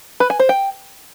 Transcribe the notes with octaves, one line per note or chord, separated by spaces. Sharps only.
B4
G#5
C5
G5